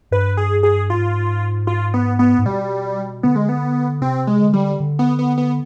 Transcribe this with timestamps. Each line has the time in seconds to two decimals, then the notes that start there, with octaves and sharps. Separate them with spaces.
0.11 G2 B4
0.37 G#4
0.63 G#4
0.90 G#2 F4
1.67 F4
1.94 B3
2.19 B3
2.39 G#2
2.45 B2 G3
3.23 D3 B3
3.36 G#3
3.49 B3
4.01 C3 C4
4.27 G#3
4.40 D3
4.53 G3
4.80 D3
4.99 B3
5.19 B3
5.38 B3